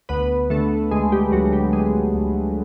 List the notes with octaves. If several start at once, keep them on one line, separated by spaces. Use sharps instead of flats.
D2 B3 B4
D3 A3 A4
D2 G#3 G#4
G3 G4
D2 F#3 F#4
G3 G4
G3 G#3 G#4
D2